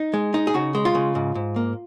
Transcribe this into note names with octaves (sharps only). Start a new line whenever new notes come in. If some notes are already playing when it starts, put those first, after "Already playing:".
Already playing: D#4
G#3
D#4
G#4
C#3 F#4
G#3
F4
C#3
G#2
G#2
A#3